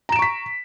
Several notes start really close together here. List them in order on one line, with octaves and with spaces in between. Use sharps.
A#5 E7 D7 C#6 B6